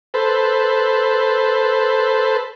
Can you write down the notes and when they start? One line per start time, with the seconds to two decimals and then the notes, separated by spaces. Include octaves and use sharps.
0.14 A4 B4 C5